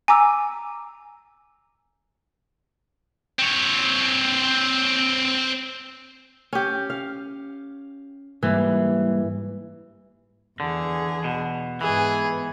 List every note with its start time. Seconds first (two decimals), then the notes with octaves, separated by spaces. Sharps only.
0.08 G#5 A#5 D6 E6
3.39 C4 C#5
6.53 C#4 G4
6.90 F5
8.43 G#2 E3 G3 A#3
10.60 E2 D3 G#4
11.24 B2
11.81 G#2 E3 B3 G#4